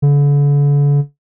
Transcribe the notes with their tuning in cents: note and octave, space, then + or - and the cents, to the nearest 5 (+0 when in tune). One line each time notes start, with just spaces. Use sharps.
D3 -40